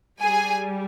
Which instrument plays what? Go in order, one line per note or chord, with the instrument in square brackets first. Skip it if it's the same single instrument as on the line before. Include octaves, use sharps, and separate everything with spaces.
[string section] G3 G#4 G#5